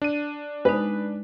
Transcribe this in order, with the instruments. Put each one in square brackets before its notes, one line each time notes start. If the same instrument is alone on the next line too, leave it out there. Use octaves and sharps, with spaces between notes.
[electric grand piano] D4 D#7
[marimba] G#3 D#4 [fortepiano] B4